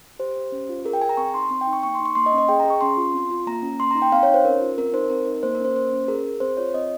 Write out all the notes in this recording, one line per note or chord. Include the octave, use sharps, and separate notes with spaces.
G4 C5
G4
C#4
F4
G#4 A#4
G5
G#4 G#5
A#5
C4 C#6
D#4 C6
C4
G5
D#4
C#6
A#3 C#6
C6
D#4
C#6
A#3 C6
D#5
C#4
D#5
G#4 G5
G#4 A#5
C#6
C#4 C6
F4
C4
F4
A#3 A#5
C#4
A#3 C6
D#4 A#5
G5
C4 F5
C#5
D#4
C5
C#4 A#4
F4
C4 A#4
D#4 C5
C4 A#4
D#4
A#3 C5
A#4
C#4 C5
A#3 C5
C#4
G#4 A#4
G#4
C4 C5
F4 C#5
C4 D#5